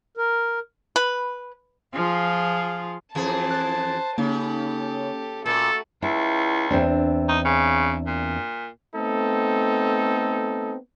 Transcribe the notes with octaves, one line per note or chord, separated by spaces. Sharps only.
A#4
B4
F3 F4 G#4
F2 E3 G#4 C5 A5
F#6 A6
C#3 A#3 D#4 G4 A4
A#2 A3 F#4 A4
C#2 E4
E2 C4 D4
D#4
C#3
A#2
A3 B3 C4 D#4 A4